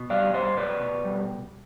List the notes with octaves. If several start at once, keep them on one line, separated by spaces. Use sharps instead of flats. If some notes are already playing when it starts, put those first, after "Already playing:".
Already playing: B2
G3 D5 F5
G3 C5 D#5
B2 B4 D5
B2
G3